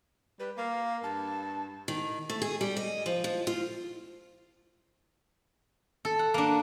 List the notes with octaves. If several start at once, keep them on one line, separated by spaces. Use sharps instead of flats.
G3 B4
A#3 F5
G2 A5
D#3
A3
G#4
G3
D#5
F3
F3
F4
A4
F#5
A#3 D4